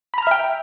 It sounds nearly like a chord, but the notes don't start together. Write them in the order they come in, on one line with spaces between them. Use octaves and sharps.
B5 A#5 F6 E5 G5